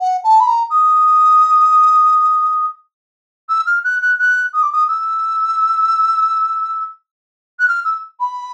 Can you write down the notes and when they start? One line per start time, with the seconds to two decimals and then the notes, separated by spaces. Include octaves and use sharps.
0.01 F#5
0.24 A5
0.40 B5
0.47 A#5
0.70 D#6
3.49 E6
3.67 F6
3.84 F#6
4.02 F#6
4.19 F#6
4.54 D#6
4.63 D6
4.73 D#6
4.88 E6
7.60 F#6
7.68 F6
7.85 E6
8.20 B5